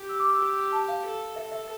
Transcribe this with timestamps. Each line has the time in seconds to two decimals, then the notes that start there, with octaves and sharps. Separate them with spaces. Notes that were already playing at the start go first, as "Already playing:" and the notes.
Already playing: G4
0.09 E6
0.20 D6
0.30 E6
0.40 G4
0.72 A5
0.88 F5
1.04 A4
1.36 A4 E5
1.52 E5